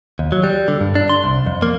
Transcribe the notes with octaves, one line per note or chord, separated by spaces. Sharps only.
D#2
F#3
G3
D3
G2
D4
C6
C2
F2
A#3